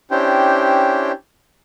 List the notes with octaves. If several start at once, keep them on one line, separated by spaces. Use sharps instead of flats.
C#4 D4 E4 G4 C5 G5